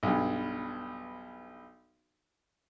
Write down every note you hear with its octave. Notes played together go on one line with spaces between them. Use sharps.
B1 G2